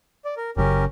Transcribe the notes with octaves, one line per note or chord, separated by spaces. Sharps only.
D5
A#4
F#1 F#2 C#3 C#4 G4 A#4